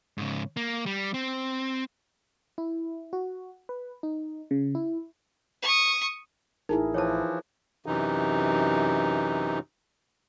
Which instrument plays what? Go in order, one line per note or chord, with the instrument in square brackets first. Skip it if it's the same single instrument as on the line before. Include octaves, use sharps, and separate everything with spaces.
[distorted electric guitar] G#2 C#3
A#3
G3
C4
[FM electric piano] E4
F#4
B4
D#4
C#3
E4
[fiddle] C#6 D#6
[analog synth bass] A1 [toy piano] D#4 [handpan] E4 G#4 A#4
[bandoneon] E3 F3 [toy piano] C#5 A5
[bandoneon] F#2 C3 E3 D#4